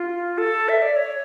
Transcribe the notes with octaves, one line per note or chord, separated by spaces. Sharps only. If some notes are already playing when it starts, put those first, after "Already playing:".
Already playing: F4
A4
E5
D5
C#5